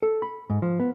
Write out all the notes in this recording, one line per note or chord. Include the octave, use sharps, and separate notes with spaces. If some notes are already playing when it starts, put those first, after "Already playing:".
A4
B5
G#2
F3
B3